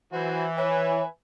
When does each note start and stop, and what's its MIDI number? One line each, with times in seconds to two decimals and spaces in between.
0.13 1.02 52
0.13 0.45 54
0.13 0.45 66
0.13 0.45 72
0.57 1.06 71
0.57 1.01 73
0.57 1.06 76
0.57 1.06 80